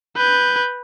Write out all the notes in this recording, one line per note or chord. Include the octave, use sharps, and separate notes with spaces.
B4 G6